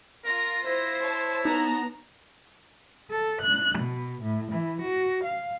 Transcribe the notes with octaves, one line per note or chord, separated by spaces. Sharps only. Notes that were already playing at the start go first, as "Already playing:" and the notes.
F4 A#4 A#6
E4 C5
C#5 A5
B3 D#4 A#5
A4
F#6
B2
A2
E3
F#4
F5